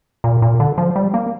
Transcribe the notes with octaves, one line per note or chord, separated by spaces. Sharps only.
A#2
A#2
D3
F3
G3
A#3